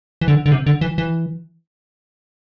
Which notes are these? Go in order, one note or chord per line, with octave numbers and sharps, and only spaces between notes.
E3
D3
D3
C3
D3
E3
E3